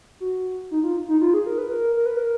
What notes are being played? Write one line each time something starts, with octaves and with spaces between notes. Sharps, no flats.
F#4
D#4
F4
D#4
F4
G#4
A#4
B4
A#4
A#4
B4
A#4